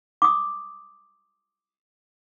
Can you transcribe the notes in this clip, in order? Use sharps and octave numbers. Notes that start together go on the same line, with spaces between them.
D6 D#6